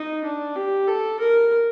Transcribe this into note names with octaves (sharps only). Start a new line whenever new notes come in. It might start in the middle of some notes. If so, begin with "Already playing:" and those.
Already playing: D#4
D4
G4
A4
A#4